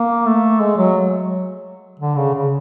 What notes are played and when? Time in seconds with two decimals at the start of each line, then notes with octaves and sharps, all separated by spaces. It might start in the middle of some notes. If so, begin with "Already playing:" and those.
Already playing: A#3
0.26 A3
0.61 G#3
0.78 F#3
2.00 D3
2.17 C#3
2.34 C#3